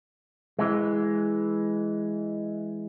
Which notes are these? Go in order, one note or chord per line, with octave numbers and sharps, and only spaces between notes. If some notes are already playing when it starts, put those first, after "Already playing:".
E3 G#3